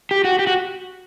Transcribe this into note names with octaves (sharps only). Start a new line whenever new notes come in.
G4
F#4
G4
F#4